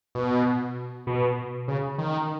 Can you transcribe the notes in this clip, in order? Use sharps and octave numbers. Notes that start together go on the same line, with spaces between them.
B2
B2
C#3
D#3